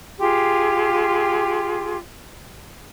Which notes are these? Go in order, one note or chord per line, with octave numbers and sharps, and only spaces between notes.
F4 G4 G#4 C6